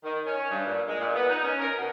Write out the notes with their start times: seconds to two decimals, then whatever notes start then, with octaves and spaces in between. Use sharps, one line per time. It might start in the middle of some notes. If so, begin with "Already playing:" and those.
0.03 D#3
0.25 C#4
0.50 G2
0.66 A#2
0.88 G#3
1.00 A#2
1.15 B3
1.29 D#4
1.44 C#4
1.60 A#4
1.76 B2